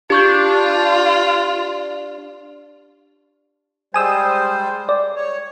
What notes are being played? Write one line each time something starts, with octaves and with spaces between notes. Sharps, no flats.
D4 F4 G4 C#6 G6
G3 G#3 C5 G#5 D#6 E6
D5
C#5